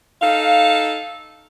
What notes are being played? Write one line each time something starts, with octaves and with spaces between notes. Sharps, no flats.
D#4 A4 F5